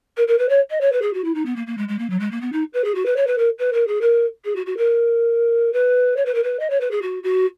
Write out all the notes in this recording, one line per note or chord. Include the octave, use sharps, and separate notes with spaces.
A#4
A#4
B4
C#5
D#5
C#5
B4
G#4
F#4
E4
D#4
B3
A#3
A#3
G#3
G#3
A#3
F#3
G#3
A#3
B3
D#4
B4
G#4
F#4
B4
C#5
B4
A#4
B4
A#4
G#4
A#4
G#4
F#4
F#4
A#4
B4
C#5
B4
A#4
B4
D#5
C#5
B4
G#4
F#4
F#4